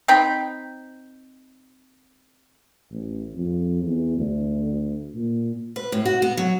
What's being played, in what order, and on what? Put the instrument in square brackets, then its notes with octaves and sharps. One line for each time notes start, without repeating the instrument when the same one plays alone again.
[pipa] C4 D#4 G5 B5
[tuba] A1
F2
E2
D2
A#2
[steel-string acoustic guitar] B4
A2
F#4
B3
F#3